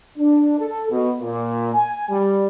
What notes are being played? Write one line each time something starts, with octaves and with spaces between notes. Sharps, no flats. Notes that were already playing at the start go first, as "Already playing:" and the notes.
D4
A4
B2
A#2
G#5
G3